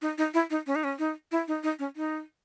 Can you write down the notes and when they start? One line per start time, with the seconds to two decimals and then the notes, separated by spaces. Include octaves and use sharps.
0.02 D#4
0.18 D#4
0.34 E4
0.50 D#4
0.67 C#4
0.75 D#4
0.84 C#4
0.99 D#4
1.32 E4
1.48 D#4
1.63 D#4
1.79 C#4
1.96 D#4